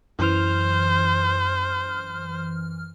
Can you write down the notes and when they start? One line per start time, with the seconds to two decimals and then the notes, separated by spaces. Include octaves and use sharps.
0.19 F#2 E3 C5 F6